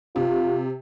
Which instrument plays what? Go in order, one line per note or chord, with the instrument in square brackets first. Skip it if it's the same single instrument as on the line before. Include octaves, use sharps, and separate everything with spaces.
[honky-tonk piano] C3 [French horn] F4